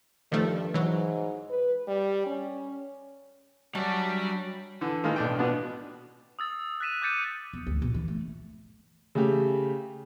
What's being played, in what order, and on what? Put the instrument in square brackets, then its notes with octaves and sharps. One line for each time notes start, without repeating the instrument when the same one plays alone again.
[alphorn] G2 [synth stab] D#3 F3 A3
[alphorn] G#2 [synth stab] E3 F#3
[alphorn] B4
G3
C#4
[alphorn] F#3 [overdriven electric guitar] G3 D5 [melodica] C#4 F#4 E5 [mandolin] D4
[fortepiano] D3 E3
D#3 E3 G#3 A#3
B1 D4 G5
B2 B3 D4 F#4
[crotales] D#6 E6 A6
F#6 A6 B6 D#7 E7
D6 G6 A6 C#7 D#7
[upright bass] E2
D2
A#2
E3
A3
[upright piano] C#3 A3 G4